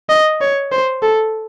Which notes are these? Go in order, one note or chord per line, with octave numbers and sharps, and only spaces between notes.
D#5
C#5
C5
A4